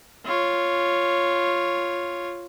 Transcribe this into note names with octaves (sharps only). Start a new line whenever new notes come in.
F4 C#5